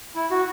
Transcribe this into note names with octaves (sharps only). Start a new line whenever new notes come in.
E4
F#4